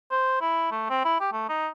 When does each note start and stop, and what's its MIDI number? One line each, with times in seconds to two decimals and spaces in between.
0.11 0.38 72
0.41 0.68 64
0.71 0.85 57
0.90 1.04 60
1.05 1.17 64
1.20 1.28 67
1.32 1.46 57
1.49 1.68 63